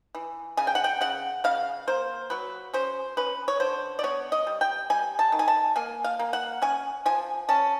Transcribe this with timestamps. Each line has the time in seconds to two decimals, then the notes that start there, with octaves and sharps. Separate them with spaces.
0.15 E3
0.57 C#3 G#5
0.67 G5
0.75 F#5
0.84 G5
1.01 C#3 F#5
1.44 C#3 F5
1.87 A#3 C5
2.30 F#3 B4
2.74 C#4 C5
3.17 C#4 B4
3.48 C#5
3.60 D3 C5
3.99 D5
4.03 B3 C#5
4.32 D#5
4.47 G3
4.61 G5
4.90 G3 G#5
5.19 A5
5.32 D#3
5.39 G#5
5.48 A5
5.76 A#3 G#5
6.04 F5
6.19 A#3
6.33 F#5
6.62 C#4 G#5
7.06 F3 G#5
7.49 C#4 A5